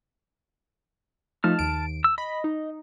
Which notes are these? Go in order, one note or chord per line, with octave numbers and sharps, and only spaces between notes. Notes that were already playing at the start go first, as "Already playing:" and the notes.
F3 A3 D#4 A5 F6
D#2 D7
E6
D#5 B5
D#4